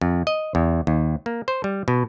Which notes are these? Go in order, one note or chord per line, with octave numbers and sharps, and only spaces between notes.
F2
D#5
E2
D#2
A#3
C5
G3
B2